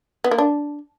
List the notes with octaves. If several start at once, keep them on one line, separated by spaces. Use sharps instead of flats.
B3
A#3
D4